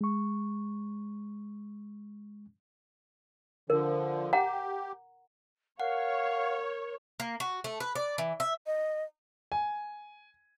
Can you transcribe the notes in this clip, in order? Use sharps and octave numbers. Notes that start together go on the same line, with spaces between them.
G#3 C#6
D3 F3 A#4
G4 F#5 A#5
A#4 C#5 F5 F#5
A#3
F#4
A3
B4
D5
E3
E5
D#5
G#5